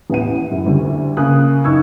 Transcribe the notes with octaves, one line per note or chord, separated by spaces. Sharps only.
A1 B3 F#5 D#7
F#2 E4
D2 D3 G3
C#3 A#3 G#5 D#6 F#6
F#1 D#4 C#6 E6 G#6